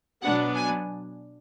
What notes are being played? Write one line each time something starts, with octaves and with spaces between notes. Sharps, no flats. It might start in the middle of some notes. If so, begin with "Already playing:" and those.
B2 F#3 B3 D4 F#5
G#5